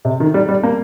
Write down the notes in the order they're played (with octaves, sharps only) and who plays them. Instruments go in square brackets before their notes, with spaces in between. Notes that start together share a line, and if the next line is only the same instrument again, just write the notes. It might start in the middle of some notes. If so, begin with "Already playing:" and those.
[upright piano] C3
D#3
G3
G3
A#3